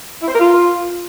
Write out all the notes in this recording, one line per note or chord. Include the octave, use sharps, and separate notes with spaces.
E4
C5
A#4
F4